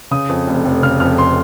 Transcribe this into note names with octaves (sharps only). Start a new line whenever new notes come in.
C#3 D#6
F2
F1
F1
C#3 F6
F2 F6
C6